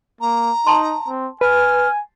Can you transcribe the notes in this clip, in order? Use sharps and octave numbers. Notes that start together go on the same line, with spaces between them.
A#3 A#5
D#4 A5 C6
C4
B4 G#5 F6